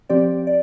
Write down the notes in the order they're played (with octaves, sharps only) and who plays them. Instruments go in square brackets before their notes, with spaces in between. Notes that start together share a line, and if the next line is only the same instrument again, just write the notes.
[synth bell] F3 C4 G4 D5
D5